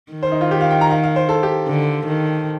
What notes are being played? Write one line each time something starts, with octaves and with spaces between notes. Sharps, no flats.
D#3
C5
D#4
F4
G4
F5
G5
A#5
F5
F5
C5
A4
G4
D3
D#3